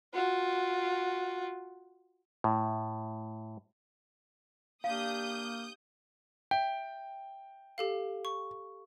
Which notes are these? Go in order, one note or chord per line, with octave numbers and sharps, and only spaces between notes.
F4 F#4
A2
A#3 D4 G4 F5 D#6 G6
E5 G5
G4 A4 F5
C#6